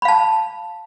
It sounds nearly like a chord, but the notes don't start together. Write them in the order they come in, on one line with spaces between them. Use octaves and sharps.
B5 F5 A5